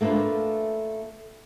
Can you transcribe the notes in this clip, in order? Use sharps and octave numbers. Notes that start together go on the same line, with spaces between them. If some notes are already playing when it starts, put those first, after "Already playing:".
A3 A#3 D4 F4 B4